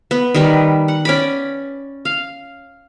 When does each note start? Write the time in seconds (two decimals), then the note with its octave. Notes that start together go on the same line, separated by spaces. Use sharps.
0.11 B3
0.35 D#3 G3 B4
0.88 F#5
1.05 C#4 D5 B5
2.05 F5